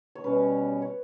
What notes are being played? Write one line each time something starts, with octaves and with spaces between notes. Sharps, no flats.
C#5
B2 G3 C#4 B4
C#5